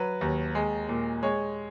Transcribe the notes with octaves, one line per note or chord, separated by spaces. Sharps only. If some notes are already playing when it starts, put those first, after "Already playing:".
Already playing: F#3 B4
D#2
G#3
A#2
G#3 C#5